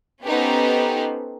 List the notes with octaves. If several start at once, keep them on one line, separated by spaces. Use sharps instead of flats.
B3 C#4 D#4 G4 A4 C5